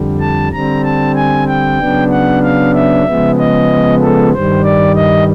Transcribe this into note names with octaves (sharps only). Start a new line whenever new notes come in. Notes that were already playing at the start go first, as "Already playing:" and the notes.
Already playing: F2 D3 G3
A5
D3 G3 C4 A#5
A5
G#5
G5
C#3 F#3 B3 D4
F#5
F5
E5
C#3 F3 G#3 B3
D#5
A4
G2 D#3 G3 C5
D5
D#5